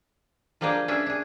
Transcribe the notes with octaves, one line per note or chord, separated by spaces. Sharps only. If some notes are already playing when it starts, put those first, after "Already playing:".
F3 G3 A#3 D4 G4 G#4
C#4 D4 G#4 E5
D4 G#4